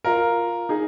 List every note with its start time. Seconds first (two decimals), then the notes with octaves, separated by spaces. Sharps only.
0.04 F4 A#4
0.69 D#4 G#4